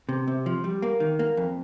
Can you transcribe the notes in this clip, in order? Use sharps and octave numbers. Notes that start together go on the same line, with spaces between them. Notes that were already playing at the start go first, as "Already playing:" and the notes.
C3
C3
F3
G3
A#3
D#3
A#3
F2